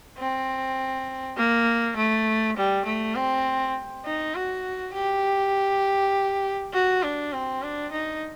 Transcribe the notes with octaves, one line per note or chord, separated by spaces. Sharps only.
C4
A#3
A3
G3
A3
C4
D#4
F#4
G4
F#4
D4
C4
D4
D#4